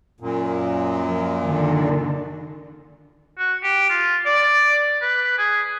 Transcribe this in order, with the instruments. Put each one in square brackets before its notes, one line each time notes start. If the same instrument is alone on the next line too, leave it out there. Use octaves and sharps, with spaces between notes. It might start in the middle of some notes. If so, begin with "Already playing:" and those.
[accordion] F#2 A#2
[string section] F3
D3 D#3
[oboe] F#4
G4
F4
D5
B4
G#4